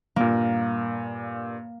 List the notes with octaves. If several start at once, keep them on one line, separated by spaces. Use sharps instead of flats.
G2 A#2 A#3